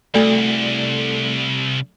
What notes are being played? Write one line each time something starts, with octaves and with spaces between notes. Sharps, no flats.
C2 A3 A4 D5